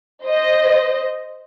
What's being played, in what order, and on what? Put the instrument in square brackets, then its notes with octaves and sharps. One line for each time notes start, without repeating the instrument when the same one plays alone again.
[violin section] C5 D#5